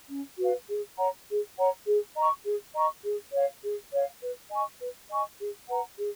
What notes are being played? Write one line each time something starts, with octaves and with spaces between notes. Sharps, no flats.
C#4
F#4 B4 F5
G#4
C#5 F#5 A#5
G#4
C#5 F#5 A#5
G#4
D#5 A#5 C#6
G#4
D#5 A#5 C#6
G#4
C#5 F5
G#4
C#5 F5
B4
D#5 G#5 C#6
B4
D#5 G#5 C#6
G#4
B4 F#5 A#5
G#4